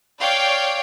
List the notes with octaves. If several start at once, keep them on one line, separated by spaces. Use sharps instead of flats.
C#5 D5 F5 G5